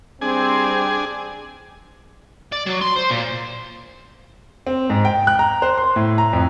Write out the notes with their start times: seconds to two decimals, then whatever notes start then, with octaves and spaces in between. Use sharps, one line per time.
0.21 G3 C4 D4 G#4 G#5
2.52 D5
2.67 F#3
2.82 C6
2.97 C5
3.11 A#2
4.67 C4
4.90 G#2
5.05 G5
5.27 F#6
5.39 A#5
5.62 C5
5.78 C6
5.96 A2
6.18 A#5
6.33 F2